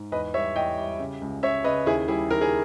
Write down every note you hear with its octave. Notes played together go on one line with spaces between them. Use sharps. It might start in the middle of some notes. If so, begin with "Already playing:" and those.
Already playing: G#2
E2 B4 D#5
G3 C#5 E5
E2 D#5 G5
G3
C#3
C#2
C#3 C#5 E5
C#3 B4 D#5
D#2 E4 G#4
G3 E4 G#4
D#3 A#4
G#4